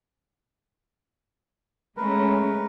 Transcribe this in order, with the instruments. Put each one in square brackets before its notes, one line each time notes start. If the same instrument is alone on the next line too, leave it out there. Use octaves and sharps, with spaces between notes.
[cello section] G#3 A3 C#4 [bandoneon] A#4 B4